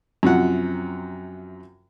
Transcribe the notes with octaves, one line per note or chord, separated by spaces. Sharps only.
F#2 C3 F3 F#5